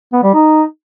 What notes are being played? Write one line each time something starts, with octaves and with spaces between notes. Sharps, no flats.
B3
G3
D#4